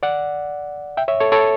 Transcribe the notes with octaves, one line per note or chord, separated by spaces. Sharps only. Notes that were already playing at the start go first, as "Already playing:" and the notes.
D5 F#5
E5 G5
C#5 E5
A4 C#5
A4 C#5